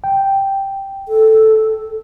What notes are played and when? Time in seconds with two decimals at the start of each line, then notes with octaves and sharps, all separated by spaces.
0.04 G5
1.08 A4